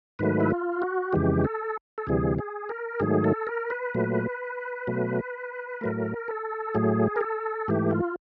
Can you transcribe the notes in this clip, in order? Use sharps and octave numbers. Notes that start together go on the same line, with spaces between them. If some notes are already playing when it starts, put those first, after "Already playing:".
G#2 D#3 F#3 A3 B4
E4
F4
F#4
F2 C#3 E3 G#3 G4
A4
A4
D2 C3 E3 G3 G#4
G#4
A#4
G#2 D#3 F#3 A3 G#4
A4
A#4
B4
A#2 F#3 A3
B2 F#3 A3
A2 F#3 A3 A#4
A4
A2 F#3 A3 G#4
A#4
A4
G#2 E3 A3 G4
F4